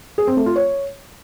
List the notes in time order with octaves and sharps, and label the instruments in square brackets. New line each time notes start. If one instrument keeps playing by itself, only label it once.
[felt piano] G#4
C4
A3
F4
C#5